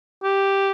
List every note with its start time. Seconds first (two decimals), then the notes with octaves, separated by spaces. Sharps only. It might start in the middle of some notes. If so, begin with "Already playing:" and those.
0.23 G4